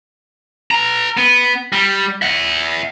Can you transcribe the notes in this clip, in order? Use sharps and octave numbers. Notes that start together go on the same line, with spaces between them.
B4 A#5
B3
G3
E5 F#5